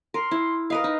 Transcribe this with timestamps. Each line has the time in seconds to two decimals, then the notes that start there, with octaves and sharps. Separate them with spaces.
0.14 A#4 C6
0.31 E4
0.70 A#4 B4 D#5 F5
0.84 D#4